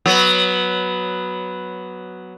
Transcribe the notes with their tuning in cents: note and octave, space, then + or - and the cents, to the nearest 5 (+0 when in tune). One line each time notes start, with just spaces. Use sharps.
F#3 +0 B3 +0